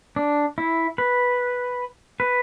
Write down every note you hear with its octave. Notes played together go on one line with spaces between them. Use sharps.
D4
E4
B4
B4